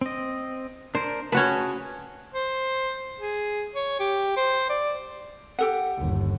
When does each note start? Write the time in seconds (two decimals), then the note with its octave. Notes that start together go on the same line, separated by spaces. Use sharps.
0.01 C4 D#5
0.95 D4 A#4 C5
1.32 C#4 F#4 G#4 B4 A5
2.34 C5
3.19 G#4
3.75 C#5
4.00 G4
4.37 C5
4.69 D5
5.59 G4 A4 F#5
5.99 G1 D#2